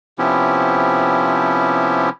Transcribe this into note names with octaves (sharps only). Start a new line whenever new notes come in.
C3 F3 B3 C#4 E4 G4